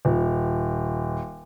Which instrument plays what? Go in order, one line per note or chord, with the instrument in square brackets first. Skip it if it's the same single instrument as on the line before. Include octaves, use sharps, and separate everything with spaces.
[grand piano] D#1